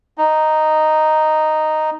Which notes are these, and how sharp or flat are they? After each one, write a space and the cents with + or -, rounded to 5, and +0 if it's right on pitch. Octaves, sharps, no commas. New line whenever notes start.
D#4 -5